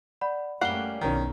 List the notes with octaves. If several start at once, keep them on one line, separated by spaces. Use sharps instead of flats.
D5 F#5 B5
F#2 G3 A3 A#3 C#4 F#5 C7 G7
B1 F2 D#3 C#4